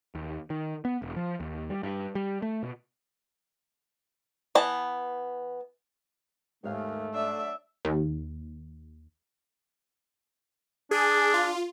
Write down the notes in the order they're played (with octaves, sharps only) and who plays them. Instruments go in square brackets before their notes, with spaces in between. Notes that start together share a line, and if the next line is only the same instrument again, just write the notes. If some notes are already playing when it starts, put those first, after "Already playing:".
[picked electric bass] D#2
D#3
B3
E1
F3
D#2
G3
G2
G3
A3
B2
[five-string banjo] E3 B3 A5
[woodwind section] D#2 [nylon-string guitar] G#2 F5 G#5 [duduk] A3
[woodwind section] F#3 D4 [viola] E5
[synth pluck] D#2
[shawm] D4 [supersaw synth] G#4
[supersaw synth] F4